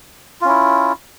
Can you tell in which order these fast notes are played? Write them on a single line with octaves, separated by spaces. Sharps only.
F4 C#4 E4